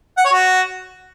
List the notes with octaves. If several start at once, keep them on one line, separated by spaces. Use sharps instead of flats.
F#5
C#5
F#4